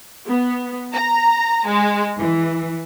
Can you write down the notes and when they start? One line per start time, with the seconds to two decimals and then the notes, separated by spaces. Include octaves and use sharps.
0.28 B3
0.95 A#5
1.67 G#3
2.20 E3